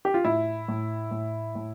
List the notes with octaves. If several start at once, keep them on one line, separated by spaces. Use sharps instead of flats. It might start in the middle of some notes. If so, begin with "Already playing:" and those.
G4
F4
A2 E4
A2
A2
A2